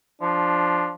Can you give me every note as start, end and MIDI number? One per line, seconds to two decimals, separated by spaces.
0.21 0.92 53
0.21 0.94 62